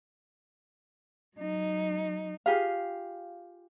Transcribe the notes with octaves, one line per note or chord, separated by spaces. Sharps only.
F#3 D#4
F4 G4 G#4 F5